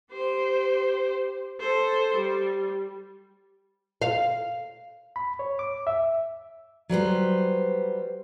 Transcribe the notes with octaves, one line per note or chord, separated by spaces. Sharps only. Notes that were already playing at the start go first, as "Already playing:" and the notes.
G4 C5
A4 C5
G3
F5
B5
C#5
D6
E5
F#3 G3 B4 C5